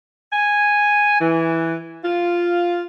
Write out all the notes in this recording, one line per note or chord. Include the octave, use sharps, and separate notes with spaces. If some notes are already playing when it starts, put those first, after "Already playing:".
G#5
E3
F4